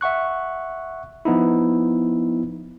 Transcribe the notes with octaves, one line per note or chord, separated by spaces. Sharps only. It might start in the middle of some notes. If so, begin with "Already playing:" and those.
E5 F#5 C#6 F#6
F3 B3 D#4 E4